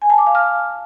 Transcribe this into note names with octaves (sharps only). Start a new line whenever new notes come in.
G#5
A5
D6
F5
F6